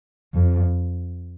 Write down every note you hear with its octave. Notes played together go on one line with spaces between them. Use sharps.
F2